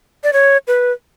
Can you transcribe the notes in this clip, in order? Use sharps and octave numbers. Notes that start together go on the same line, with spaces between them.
D5
C#5
B4